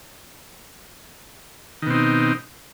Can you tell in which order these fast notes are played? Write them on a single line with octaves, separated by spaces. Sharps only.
D#3 B2 C4 D#4